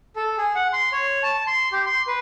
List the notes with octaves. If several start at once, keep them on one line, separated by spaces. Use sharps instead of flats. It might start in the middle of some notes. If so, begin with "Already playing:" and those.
A4
G#4
F#5
C6
C#5
A5
C6
G4
C6
B4